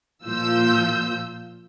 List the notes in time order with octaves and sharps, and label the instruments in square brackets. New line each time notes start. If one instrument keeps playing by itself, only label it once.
[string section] A#2 F3 F4 E6 G6